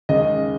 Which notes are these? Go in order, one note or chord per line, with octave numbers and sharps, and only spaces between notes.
D#2 C#3 G#3 D#5